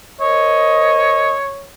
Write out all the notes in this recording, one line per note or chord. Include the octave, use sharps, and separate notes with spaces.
A#4 C5 C#5 D#5